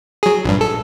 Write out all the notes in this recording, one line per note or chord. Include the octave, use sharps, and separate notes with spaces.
F#3 G#4
A#1 G2
A4